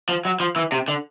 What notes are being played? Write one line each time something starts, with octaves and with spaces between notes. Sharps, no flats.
F3
F#3
F3
E3
C3
D3